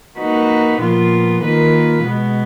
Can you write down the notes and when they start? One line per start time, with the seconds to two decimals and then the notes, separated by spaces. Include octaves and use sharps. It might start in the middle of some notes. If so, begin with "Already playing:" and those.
0.18 A#3 D#4 F#4 B4
0.80 A#2 F3 B3 F4
1.42 D#3 A#3 F4 B4
2.03 B2 G#3 B3